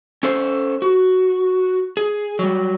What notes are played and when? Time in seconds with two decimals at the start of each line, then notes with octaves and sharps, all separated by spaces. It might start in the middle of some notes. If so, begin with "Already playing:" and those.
0.23 C#4 A4 C5
0.82 F#4
1.97 G#4
2.39 F#3 G3